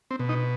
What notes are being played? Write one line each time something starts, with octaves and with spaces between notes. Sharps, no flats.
C4
B2
D#4